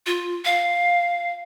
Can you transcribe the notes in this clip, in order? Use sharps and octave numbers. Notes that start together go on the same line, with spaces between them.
F4
F5